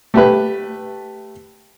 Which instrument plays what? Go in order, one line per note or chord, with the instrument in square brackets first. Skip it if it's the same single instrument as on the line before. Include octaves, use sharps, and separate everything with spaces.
[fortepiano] A3 G4 B4